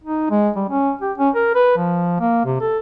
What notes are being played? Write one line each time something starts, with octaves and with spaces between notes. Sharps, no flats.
D#4
G#3
G3
C#4
G4
C#4
A#4
B4
F3
A#3
C3
A4